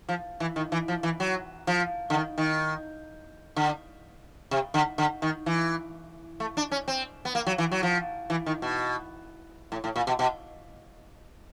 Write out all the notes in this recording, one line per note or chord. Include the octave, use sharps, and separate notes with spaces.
F3
E3
D#3
E3
F3
E3
F#3
F3
D3
D#3
D#3
D3
C3
D3
D3
D#3
E3
A3
D4
C#4
C4
B3
A#3
F#3
E3
F#3
F3
E3
D#3
B2
A2
A2
A#2
B2
B2